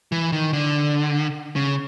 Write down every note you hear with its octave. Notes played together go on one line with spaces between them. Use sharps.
E3
D#3
D3
C#3